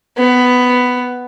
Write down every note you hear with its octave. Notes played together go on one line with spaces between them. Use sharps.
B3